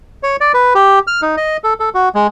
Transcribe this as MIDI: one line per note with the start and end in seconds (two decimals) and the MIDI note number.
0.23 0.36 73
0.41 0.52 74
0.54 0.73 71
0.75 0.99 67
1.07 1.21 89
1.22 1.36 63
1.37 1.57 75
1.64 1.74 69
1.80 1.89 69
1.95 2.09 66
2.15 2.27 56